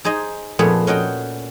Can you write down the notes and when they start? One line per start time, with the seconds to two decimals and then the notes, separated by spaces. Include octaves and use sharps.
0.05 D#4 G#4 C5 D#5
0.59 F2 A#2 A3 B3 G#4
0.87 C#4 F#4 D#5 G5